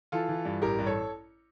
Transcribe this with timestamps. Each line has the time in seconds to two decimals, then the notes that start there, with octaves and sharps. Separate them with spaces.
0.12 E3 F4 A4
0.29 E3
0.45 G2
0.62 A1 G4 A#4
0.79 G2
0.86 A4 C#5